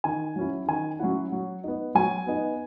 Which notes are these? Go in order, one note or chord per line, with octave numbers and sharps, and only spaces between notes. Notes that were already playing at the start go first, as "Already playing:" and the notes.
D#3 G#5
F#3 C#4 E4
D#3 G#5
F#3 C#4 E4 F#5
F#3
B3 D#4
F#3 G#5
B3 D#4